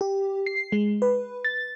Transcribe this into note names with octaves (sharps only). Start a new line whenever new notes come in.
G4
C7
G#3
B4
A6